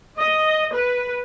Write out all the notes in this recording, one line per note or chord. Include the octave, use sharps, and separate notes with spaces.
D#5
B4